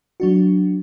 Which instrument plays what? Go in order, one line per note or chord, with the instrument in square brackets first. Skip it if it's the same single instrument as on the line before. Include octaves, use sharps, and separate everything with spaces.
[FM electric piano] F#3 D4 F#4